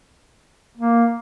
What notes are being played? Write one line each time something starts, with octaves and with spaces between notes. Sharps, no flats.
A#3